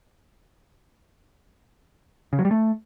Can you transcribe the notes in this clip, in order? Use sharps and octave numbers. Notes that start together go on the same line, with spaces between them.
C#3
F#3
G3
A3